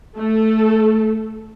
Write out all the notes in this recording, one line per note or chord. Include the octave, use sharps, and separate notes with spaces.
A3 A4